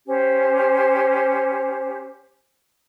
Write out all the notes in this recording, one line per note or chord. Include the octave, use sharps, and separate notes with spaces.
C#4 G4 C5